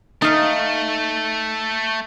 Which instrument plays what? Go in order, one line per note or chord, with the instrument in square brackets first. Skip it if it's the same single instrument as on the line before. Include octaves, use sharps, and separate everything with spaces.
[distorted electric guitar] A3 [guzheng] D#4 F5